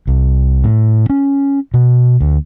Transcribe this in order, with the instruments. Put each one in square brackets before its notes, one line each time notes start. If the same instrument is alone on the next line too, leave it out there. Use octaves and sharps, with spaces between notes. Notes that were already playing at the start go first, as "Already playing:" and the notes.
[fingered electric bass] C2
A2
C#4
B2
D2